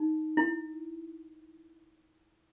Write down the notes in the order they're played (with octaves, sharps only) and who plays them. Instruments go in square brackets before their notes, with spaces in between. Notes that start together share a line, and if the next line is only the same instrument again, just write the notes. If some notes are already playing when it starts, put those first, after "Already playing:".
Already playing: [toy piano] D#4
E4